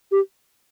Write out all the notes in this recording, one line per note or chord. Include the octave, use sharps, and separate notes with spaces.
G4